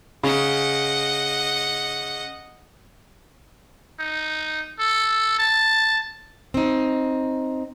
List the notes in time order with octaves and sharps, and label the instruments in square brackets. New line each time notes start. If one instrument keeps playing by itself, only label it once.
[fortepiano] C#3 [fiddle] D#5 F#5
[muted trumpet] D#4
A4
A5
[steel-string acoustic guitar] C4 D#4